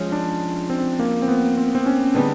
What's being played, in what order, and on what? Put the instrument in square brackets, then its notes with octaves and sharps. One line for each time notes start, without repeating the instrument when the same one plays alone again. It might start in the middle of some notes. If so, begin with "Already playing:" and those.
Already playing: [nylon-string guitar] F3 G#3 C#4
[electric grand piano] D4
C4
A#3
C4
B3
C4
C4
C#4
[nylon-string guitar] D3 G3 B3 D#4 G#4 [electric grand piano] D4